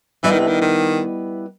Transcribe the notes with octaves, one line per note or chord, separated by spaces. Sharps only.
E3 G3 B3 E4 B4 D#5
D#3
C3
D#3
D#3